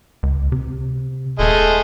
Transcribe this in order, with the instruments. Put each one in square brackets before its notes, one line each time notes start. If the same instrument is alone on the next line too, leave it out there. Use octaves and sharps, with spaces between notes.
[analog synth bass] C#2
C3
[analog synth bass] D#1 [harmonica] G#3 A3 D#5